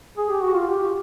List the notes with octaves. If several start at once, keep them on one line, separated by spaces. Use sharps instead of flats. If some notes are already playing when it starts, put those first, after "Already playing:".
G#4
G4
F#4
F4
G4